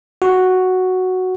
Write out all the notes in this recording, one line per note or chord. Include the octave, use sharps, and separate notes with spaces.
F#4